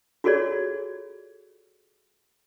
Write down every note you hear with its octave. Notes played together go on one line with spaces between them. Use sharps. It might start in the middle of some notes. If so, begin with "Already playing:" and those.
F4 F#4 G#4 A4 C#5 D5